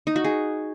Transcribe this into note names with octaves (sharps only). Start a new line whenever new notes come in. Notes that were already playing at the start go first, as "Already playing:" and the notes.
D#4
F#4
G#4